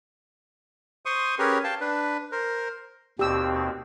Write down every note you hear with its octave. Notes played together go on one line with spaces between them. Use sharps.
C5 C6 C#6 D#6
C#4 G4 G#4 A#4 B4 C#5
F5 G5 A5
D4 B4
A#4 C5
D#2 B2 C4 G4 E6